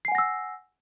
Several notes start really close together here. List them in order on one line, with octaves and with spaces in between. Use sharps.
C7 G#5 F#5 A#6 E6